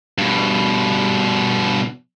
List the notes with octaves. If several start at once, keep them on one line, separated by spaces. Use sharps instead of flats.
G2 B2